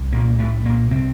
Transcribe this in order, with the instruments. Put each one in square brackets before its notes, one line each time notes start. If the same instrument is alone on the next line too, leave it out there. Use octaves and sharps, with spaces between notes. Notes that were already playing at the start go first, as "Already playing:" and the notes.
Already playing: [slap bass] C2
A#2 A#3
A2 A3
A#2 A#3
C3 C4